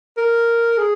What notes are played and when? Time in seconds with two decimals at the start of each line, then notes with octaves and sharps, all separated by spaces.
0.17 A#4
0.77 G#4